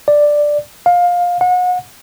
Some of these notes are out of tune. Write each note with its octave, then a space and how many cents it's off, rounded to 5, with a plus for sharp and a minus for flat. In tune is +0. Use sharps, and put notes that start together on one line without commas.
D5 +5
F5 +20
F#5 -35